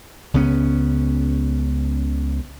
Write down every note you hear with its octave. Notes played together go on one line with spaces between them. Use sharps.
C#2 C#3 B3 C#4